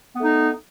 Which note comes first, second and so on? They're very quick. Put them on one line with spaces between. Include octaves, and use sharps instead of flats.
B3 A3 D#4